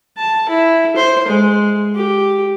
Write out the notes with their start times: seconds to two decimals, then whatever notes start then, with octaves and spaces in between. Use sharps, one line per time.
0.17 A5
0.49 E4
0.96 C5
1.28 G#3
1.95 G4